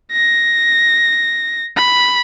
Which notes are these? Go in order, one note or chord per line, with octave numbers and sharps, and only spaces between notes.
A#6
B5